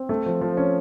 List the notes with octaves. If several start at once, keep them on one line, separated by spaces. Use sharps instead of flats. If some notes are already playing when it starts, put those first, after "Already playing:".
Already playing: C4
A3
F3
F3
C#4